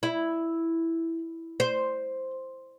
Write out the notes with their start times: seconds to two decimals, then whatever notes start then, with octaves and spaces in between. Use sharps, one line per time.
0.03 E4
1.60 C5